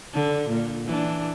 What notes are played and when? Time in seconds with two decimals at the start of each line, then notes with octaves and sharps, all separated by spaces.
0.13 D3
0.49 A#2
0.86 E3 D4